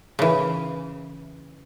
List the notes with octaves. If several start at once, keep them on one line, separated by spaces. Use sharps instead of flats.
C#3 E3